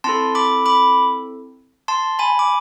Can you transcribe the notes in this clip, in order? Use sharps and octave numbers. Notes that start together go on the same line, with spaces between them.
C4 E4 A4 A5 C6
B5 D6
B5 D6
A5 C6
G#5 B5
D6